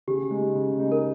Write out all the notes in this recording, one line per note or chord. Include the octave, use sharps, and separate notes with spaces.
C#3 G4
G#3 D#4
C#3
G#3 D#4
A#4